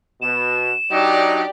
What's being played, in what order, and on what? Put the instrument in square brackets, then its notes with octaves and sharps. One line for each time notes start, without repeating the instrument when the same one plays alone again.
[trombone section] B2 [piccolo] E7
[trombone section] F#3 D4 D#4 [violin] G4 D5